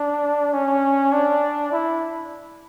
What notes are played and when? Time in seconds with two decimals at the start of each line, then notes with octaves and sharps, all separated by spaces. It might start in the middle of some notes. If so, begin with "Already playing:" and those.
Already playing: D4
0.53 C#4
1.13 D4
1.72 E4